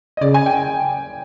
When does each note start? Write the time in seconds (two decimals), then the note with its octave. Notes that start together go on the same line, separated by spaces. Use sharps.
0.17 D#5
0.21 C#3 D5
0.34 G#5
0.46 G5